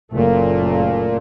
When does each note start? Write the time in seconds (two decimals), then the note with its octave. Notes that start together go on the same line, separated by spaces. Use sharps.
0.13 F#1 A#2 A3